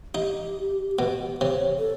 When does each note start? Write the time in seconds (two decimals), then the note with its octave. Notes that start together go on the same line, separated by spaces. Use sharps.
0.15 D#4 G4
0.99 B2
1.41 C3 C#5
1.78 A4